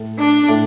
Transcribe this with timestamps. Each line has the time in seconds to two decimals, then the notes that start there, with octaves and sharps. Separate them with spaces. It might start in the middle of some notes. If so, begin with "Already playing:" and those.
Already playing: A2
0.19 D4
0.49 A2